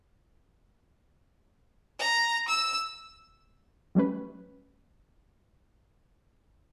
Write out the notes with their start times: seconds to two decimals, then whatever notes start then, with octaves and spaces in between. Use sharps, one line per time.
1.99 A#5
2.48 E6
3.95 F#3 G3 A3 C#4 B4